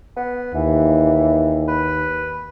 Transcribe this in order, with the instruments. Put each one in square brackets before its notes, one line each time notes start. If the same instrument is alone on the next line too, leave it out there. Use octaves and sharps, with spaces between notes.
[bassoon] B3
[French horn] D#2 [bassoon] E3
[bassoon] B4